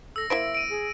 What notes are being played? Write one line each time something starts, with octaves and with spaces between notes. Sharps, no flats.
A4 E6 A#6
A#3 E4 C5 E5 D7
D7 D#7
G#4